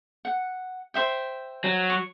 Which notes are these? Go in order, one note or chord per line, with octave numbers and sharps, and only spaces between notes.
F#5
C5 E5 G5
F#3
C#6